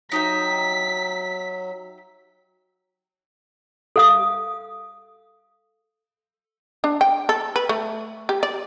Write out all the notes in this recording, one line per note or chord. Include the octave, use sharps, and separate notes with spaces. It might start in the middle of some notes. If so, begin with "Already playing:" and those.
F#3 D#4 G4 E5 B6
A4 F5 D#6
D4
G5
A4
B4
A3
G4
D5